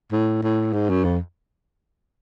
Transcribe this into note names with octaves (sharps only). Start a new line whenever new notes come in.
A2
A2
G#2
F#2
F2